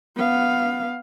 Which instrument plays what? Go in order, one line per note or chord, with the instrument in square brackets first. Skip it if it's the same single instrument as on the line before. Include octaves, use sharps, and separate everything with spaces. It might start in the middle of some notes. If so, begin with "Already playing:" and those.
[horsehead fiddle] B3 F5